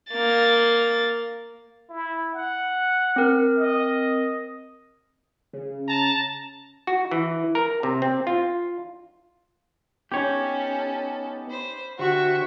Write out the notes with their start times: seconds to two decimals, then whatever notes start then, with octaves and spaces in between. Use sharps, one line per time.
0.12 A#3 A6
1.90 E4
2.34 F#5
3.16 C4 A#4
3.58 D#5
5.53 C#3
5.88 A5 A#5
6.87 F#4
7.11 E3
7.55 A#4
7.83 C3
8.02 C4
8.27 F4
10.12 B3 C#4 D#4 G4 A4 C#5
11.50 C5 B5
11.99 D3 F#4 G4 C5 E5 C#6